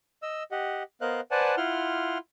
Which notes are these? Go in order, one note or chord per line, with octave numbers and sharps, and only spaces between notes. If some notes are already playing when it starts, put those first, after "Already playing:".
D#5 E6
G4 D#5 F#5
B3 A#4 C5 D#5 F5 F#6
B4 C5 D5 F#5 G#5 A5
E4 F4 F#5 C6 F6